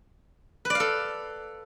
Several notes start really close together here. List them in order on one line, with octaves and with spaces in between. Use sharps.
B4 D5 F5 A4